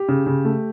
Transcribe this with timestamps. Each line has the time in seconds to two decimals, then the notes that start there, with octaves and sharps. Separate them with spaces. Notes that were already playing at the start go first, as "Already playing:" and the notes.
Already playing: G4
0.08 C#3
0.26 C#3
0.45 A3